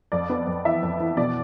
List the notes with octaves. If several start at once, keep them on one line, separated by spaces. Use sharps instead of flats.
F2 D5
B3
F2
E3 E5
F2
E3
B2 D5